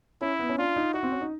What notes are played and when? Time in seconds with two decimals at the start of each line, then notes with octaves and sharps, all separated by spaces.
0.21 C#4 E4
0.39 B3
0.49 C#4
0.58 D4 F4
0.76 D#4
0.94 E4 F#4
1.03 C4
1.12 C#4
1.21 D#4